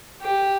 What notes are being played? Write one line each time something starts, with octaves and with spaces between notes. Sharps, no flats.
G4